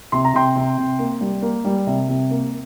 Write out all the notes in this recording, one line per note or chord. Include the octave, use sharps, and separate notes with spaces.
C3 C6
A#5
C3 G5 C6
C3
C3
A#3
G3
A#3
G3
C3
C3
A#3